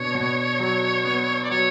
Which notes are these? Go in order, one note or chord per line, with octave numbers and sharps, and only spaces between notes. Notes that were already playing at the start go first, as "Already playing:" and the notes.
Already playing: B2 D4 C#5
B2
F#3
B3
D5
F#3 C#5